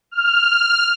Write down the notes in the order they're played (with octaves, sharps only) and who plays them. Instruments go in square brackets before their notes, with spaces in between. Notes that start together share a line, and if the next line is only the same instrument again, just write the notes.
[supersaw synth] F6